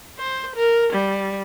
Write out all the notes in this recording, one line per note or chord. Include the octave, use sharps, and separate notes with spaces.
C5
A#4
G3